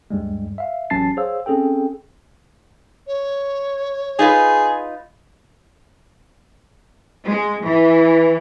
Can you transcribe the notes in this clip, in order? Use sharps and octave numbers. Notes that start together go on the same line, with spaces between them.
D2 G2 G3 G#3
E5 F5
A1 F#3 C#4 A5 A6 C7
G#4 C5 C#5 F5 E6
C4 C#4 G#4 A4 G5
C#5
D#4 F4 G#4 B4
G#3
E3